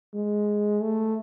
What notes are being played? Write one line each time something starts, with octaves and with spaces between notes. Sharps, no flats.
G#3
A3